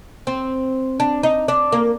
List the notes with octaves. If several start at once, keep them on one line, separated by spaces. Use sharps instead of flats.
C4
D4
D#4
D4
A#3